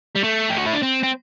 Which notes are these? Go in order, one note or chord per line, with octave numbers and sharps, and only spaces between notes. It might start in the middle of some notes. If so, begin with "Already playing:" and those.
G3
A3
G4
F#4
E4
D4
C4
C4